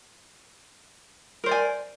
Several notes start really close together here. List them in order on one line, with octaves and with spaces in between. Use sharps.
A#4 C5 D5 G#5